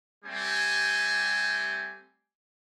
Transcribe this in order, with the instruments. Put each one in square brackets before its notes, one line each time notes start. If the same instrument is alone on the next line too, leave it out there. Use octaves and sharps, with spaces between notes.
[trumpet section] G3 A3 C4 G4 G#5